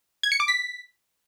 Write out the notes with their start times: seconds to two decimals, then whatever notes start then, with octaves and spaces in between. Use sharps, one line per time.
0.23 G#6
0.32 C#7
0.40 D6
0.48 B6